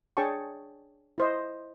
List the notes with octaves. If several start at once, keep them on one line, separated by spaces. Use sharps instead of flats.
D4 G#4 C#5 G5 A5 C#6
E4 C5 D#5